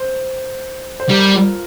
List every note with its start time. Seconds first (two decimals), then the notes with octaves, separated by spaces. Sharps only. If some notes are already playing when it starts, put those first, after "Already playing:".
Already playing: C5
1.00 C5
1.09 G3 A#4
1.34 F4